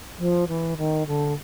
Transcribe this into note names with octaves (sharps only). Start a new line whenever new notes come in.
F3
E3
D#3
D3